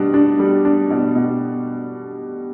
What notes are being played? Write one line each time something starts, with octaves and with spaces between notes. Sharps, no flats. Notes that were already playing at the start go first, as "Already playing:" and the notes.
Already playing: B2 G3 D4
D4
G3
D4
B2
B2